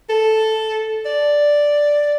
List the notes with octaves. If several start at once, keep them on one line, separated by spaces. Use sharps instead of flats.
A4
D5